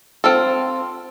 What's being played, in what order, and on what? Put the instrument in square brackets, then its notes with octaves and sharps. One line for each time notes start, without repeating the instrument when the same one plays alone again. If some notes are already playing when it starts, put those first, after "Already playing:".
[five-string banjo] C4 F4 A4